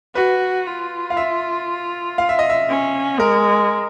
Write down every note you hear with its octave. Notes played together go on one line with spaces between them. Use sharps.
F#4 B4
F4
F5
E5
F5
E5
D#5
E5
C#4
G#3 A#4